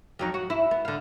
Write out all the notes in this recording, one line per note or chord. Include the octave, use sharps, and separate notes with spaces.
F2 F#3 D#4
F#4
E4
B3
D3 F5